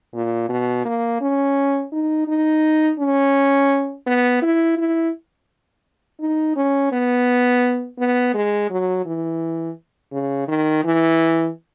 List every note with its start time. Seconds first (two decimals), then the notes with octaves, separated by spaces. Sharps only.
0.14 A#2
0.49 B2
0.85 A#3
1.21 C#4
1.92 D#4
2.28 D#4
2.99 C#4
4.07 B3
4.42 E4
4.78 E4
6.20 D#4
6.56 C#4
6.92 B3
7.98 B3
8.34 G#3
8.70 F#3
9.06 E3
10.12 C#3
10.48 D#3
10.84 E3